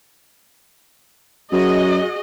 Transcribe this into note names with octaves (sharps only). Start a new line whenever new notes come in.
F#2 F#4 G#4 D#5